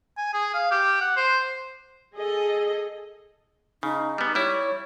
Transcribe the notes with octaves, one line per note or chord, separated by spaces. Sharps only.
G#5
G#4
F5
G4
F#5
C5
G#4 A4 D#5
C#3 D#4
G3 B3
G3 E4 C#5